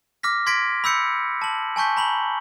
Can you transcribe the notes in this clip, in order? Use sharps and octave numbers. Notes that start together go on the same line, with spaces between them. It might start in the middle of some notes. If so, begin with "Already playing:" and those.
D6 F6 A#6 B6
C6 G#6 A#6 B6 D7
B5 E6 G6 C#7
A5 F#7
G#5 A5 C#6 G6 B6
A#5 B5 F#7 G7